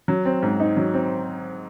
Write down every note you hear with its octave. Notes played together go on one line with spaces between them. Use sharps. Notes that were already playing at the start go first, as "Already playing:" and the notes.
F#3
C4
G#2
D#4
F#3
C4